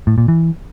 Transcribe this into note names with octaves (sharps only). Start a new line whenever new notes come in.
A2
A#2
E3